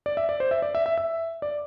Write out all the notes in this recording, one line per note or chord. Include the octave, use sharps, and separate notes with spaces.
D5
E5
D5
C5
E5
D5
E5
E5
E5
D5